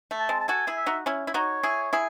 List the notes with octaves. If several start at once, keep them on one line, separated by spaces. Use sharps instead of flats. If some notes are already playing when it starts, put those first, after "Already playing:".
A3
A5
G#3 C4
A5
F#4 A4 G#5
E4 G#4
E5
D#4 F#4
C#4 E4
E4
D#4 F#4 C#5
E4 G#4
E4 G#4